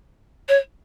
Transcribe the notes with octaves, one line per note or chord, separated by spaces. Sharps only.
C#5